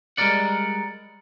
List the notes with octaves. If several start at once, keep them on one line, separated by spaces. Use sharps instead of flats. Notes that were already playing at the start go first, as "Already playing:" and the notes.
G3 G#3 A#3 A#4 D5 F#5